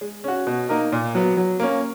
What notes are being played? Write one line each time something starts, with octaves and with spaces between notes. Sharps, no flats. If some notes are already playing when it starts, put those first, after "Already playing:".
G#3
C#4 F#4
B2
A#3 D#4 A#4
A#2
F#3 B3
F#3
A#3 C#4